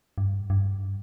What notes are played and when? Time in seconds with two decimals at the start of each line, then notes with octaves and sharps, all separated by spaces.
0.18 G2
0.50 G2